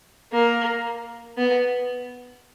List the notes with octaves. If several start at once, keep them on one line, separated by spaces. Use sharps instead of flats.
A#3
B3